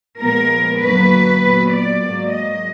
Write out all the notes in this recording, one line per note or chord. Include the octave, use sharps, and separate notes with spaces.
A#2 F3 G#3 B3 A#4
F#2 D3 F#3 A#3 B4
A#2 F#3 B3
D5
G#2 F#3 A#3
D#5